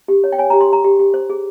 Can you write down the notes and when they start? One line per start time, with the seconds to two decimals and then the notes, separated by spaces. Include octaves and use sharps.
0.08 G4
0.24 C#5
0.32 G5
0.38 C#5 G#5
0.50 A#5
0.53 G4
0.61 C6
0.68 G4 A#5
0.84 G4
0.99 G4
1.14 C5
1.30 G#4